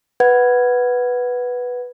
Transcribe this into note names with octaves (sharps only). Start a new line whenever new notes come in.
B4 F#5 G#6